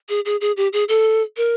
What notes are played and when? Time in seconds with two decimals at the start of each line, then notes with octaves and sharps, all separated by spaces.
0.09 G#4
0.25 G#4
0.41 G#4
0.57 G4
0.73 G#4
0.89 A4
1.37 A#4